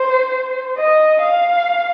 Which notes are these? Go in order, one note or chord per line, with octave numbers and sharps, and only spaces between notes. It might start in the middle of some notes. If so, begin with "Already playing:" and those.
Already playing: C5
D#5
F5